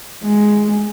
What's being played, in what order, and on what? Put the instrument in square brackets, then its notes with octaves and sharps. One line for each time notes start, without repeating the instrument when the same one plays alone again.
[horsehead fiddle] G#3